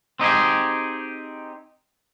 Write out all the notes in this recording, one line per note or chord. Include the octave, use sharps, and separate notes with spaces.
C4 D#4 G4 G#4